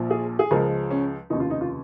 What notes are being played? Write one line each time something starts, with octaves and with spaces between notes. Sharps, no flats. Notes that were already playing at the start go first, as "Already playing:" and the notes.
Already playing: A#1 A#2 F3
G#4
G#4
C#2 C#3 F3 G#3 A#4
C#4
F1 D#2 C#3 D#4
F4
D#4
F4